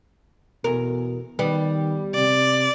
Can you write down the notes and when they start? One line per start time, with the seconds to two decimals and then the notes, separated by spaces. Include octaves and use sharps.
0.64 E2 B2 A#4
1.39 D#3 G3 B3
2.15 C3 D5